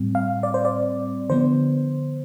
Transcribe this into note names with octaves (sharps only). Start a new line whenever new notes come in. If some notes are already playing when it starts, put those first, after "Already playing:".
Already playing: A2 G3 C4
F5
D5
C5
D5
D3 F3 B3 C5